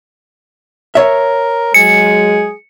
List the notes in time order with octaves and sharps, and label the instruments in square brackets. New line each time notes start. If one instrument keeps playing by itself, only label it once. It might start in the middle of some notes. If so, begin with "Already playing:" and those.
[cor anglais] A#4 [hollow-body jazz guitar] C#5 E5
[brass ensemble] F#3 G#3 [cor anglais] G#4 [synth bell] C#7